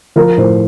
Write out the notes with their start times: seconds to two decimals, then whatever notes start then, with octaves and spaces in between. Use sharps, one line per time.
0.16 F3 A#4
0.37 A2 C5